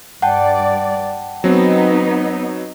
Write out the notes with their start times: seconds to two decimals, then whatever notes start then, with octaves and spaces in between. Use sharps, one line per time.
0.22 G2 D5 F#5 G5 A5
1.44 F#3 B3 C4 D#4